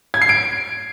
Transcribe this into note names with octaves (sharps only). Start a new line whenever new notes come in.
G#6
C7
D7